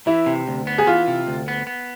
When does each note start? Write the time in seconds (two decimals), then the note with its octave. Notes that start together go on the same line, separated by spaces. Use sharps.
0.07 E3 E4
0.26 C3
0.48 D2
0.67 B3
0.78 G#4
0.87 E3 F4
1.08 C3
1.27 D2
1.48 B3
1.67 B3